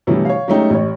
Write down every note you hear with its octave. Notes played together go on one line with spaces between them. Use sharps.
B2 D3 E3 F#3 G3 A3
C#5 F5
F#3 G#3 A3 C#4 D#4 G4
A1 C#5